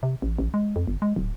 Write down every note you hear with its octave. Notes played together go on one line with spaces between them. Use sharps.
C3
A1
A1
G#3
F2
G1
G#3
D1